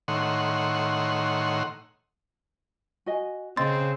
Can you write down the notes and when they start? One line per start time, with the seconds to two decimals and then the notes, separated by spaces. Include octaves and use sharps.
0.08 A2 D#3 C#5 F#5 C6
3.06 F#4 D#5 G#5
3.57 C#3 C4 D#5 C6 A6